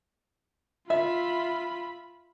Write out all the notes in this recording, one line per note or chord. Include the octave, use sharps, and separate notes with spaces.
F4 E5 B5